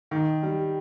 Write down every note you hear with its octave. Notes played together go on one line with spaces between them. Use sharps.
D#3
G3